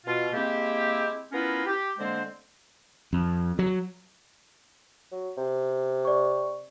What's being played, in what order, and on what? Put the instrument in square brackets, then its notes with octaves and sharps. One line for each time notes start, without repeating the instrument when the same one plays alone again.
[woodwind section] B2 F4
G#3 A#3 C4 E4 G4
B3 C#4 E4 F4 A#4 B4
G4
D3 G#3 A#3 C4 C5
[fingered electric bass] F2
F#3
[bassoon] F#3
C3
[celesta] D5 C#6